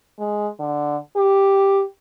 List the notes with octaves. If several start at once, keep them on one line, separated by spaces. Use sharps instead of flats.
G#3
D3
G4